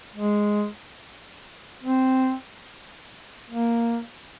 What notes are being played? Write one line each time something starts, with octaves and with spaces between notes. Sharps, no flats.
G#3
C4
A#3